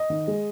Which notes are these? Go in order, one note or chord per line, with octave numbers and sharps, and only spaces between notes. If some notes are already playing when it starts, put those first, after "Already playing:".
Already playing: D#5
D#3
G#3